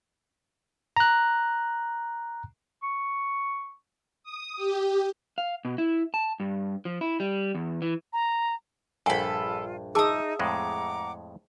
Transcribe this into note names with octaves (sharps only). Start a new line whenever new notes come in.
A#5 F#6
C#6
D#6
G4
F5
B2
E4
A5
G2
F3
E4
G3
E2
E3
A#5
A#1 G2 F4 A4 F#5 G#5 B5
D#4 G#4 E5 A5 D#6
F2 A2 G#3 F#5 A#5 D6